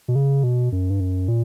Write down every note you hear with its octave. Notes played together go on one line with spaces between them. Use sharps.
B2
C#3
B2
F#2
G2
F#2
A#2